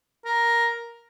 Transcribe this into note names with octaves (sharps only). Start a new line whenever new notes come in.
A#4